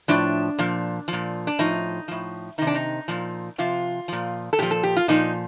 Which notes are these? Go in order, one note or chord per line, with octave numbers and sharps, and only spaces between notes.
A2 F3 D4
A#2 F3
A#2 F3
D4
A2 F3 D#4
A2 F3
C3 D#3 D#4
D4
D#4
A#2 F3
C3 F3 F4
A#2 F3
A4
A#2 F3 G4
A4
G4
F4
A#2 F3 D#4